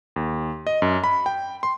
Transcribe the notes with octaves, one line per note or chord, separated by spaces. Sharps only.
D#2
D#5
F#2
B5
G5
C6